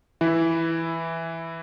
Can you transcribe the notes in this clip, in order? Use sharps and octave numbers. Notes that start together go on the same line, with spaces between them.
E3 E4